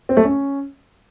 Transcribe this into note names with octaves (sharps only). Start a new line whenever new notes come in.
C4
A3
C#4